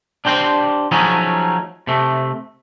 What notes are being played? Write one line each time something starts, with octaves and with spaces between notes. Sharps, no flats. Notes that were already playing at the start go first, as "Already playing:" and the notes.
D4 G4 C5 G5 C6
F3 F#3 A3 C#4 D#4 G#4
C3 A3